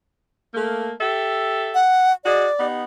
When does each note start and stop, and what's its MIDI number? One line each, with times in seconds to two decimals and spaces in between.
0.53 0.91 57
0.53 0.91 58
1.00 1.81 67
1.00 1.81 69
1.00 1.81 76
1.74 2.12 78
2.24 2.46 66
2.24 2.46 68
2.24 2.66 74
2.24 2.46 75
2.60 2.84 59
2.60 2.84 63
2.60 2.84 67